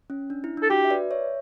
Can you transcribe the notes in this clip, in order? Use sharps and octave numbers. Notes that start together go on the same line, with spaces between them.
C#4
D4
E4
D4
A4
F#4 G4
E5
B4 D5
C#5 E5